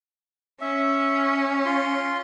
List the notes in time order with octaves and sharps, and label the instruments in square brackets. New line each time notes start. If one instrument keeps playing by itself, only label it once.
[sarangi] C#4 [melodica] E5
[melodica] F4 C6